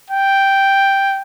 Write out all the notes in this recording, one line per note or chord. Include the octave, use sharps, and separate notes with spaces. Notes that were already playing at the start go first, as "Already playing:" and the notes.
G5